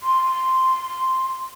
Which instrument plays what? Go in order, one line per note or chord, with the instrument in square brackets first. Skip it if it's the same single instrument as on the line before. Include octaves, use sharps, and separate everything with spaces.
[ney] C6